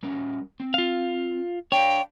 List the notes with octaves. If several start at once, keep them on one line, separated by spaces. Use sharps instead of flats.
G3 C#4 A#4
C4
F4 F5
D4 C#5 D5 F5 G5